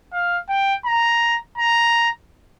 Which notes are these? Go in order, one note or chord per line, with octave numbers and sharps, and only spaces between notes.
F5
G5
A#5
A#5